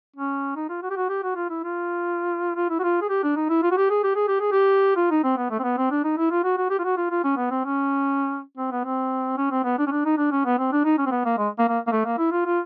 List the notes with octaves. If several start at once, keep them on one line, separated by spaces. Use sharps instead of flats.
C#4
D#4
F4
F#4
G4
F#4
G4
F#4
F4
E4
F4
F4
E4
F#4
F4
G#4
G4
D4
D#4
E4
F4
F#4
G4
G#4
G4
G#4
G4
G#4
G4
F4
D#4
C4
B3
A3
C4
B3
C4
D4
D#4
E4
F4
F#4
F#4
G4
F4
F#4
F4
F4
C#4
B3
C4
C#4
C4
B3
C4
C#4
C4
B3
D4
C#4
D4
D#4
D4
C#4
B3
C4
D4
D#4
C#4
C4
B3
A#3
G#3
A#3
A#3
A#3
A3
A#3
E4
F4
F4